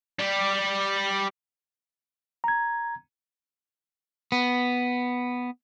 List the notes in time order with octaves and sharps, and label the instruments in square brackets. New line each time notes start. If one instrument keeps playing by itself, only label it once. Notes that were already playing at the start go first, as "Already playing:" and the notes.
[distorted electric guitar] G3 G4
[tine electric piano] A#5 G#6
[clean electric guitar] B3